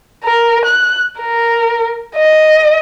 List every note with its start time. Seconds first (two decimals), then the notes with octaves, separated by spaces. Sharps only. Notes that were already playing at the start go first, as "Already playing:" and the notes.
0.24 A#4
0.65 F#6
1.20 A#4
2.15 D#5